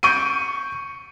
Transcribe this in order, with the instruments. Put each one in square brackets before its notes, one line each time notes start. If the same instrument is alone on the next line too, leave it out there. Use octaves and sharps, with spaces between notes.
[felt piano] C#6 G6 D7 D#7